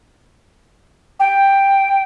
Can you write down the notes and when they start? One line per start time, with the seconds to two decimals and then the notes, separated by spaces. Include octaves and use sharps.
1.20 G5